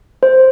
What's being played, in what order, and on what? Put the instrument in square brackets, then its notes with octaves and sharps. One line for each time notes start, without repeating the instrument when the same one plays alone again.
[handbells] C5